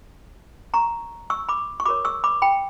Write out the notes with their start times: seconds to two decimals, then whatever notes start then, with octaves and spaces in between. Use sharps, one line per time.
0.74 A#5 C#6
1.30 C#6 E6
1.49 B5 D6
1.80 C#6
1.86 F#4 A#4 C#5 B5 D6
2.05 C#6 E6
2.24 B5 D6
2.42 G5 B5